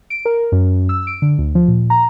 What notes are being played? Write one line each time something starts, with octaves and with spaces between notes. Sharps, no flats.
D7
A#4
F#2
E6
D7
D3
D2
F3
A#2
A#5